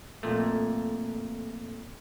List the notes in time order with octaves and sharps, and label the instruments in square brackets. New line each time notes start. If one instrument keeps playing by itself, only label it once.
[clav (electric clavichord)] F2 A#2 A3